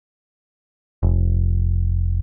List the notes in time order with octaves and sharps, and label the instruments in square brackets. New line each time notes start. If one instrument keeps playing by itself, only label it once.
[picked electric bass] F1